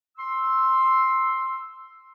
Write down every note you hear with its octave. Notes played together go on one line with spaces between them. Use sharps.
C6 E6